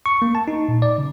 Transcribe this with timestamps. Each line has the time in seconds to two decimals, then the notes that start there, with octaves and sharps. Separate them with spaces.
0.06 C#6
0.22 A#3
0.35 A5
0.48 D#4
0.69 A#2
0.82 D5
0.98 C#3